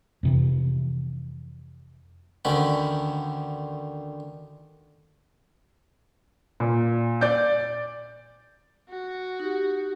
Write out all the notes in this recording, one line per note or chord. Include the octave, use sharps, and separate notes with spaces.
F2 C3 E3
D2 D3 D#3 C#4 B5
A#2
D5 G6
F#4
D#4 G4